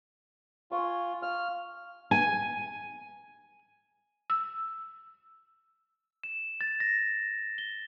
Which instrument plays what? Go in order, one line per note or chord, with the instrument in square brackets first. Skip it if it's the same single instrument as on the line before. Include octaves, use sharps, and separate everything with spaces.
[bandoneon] F4 [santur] G#5 C6 C#6
[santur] F5 [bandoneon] F6
[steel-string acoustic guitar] G#5
[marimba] E6
[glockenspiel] E7
A6
A#6
G7